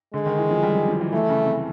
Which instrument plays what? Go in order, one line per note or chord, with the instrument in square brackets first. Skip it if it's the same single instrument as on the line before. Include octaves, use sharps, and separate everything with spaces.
[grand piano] D3 [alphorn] G#3
[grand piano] D#3
E3
F3
G3
F#3
F3
E3
[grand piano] E3 [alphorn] A3
[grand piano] C#3
C3